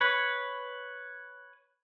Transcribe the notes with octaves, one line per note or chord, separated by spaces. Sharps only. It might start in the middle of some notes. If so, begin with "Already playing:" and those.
B4 C#5